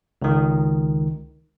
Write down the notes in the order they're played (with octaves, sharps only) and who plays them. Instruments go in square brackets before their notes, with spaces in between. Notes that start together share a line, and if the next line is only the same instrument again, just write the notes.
[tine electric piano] C#2 D#3